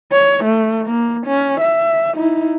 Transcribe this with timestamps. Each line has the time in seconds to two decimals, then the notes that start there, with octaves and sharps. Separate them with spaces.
0.12 C#5
0.44 A3
0.87 A#3
1.26 C#4
1.61 E5
2.15 D#4 E4